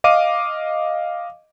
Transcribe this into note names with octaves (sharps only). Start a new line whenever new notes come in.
D#5 F5 D6 D#7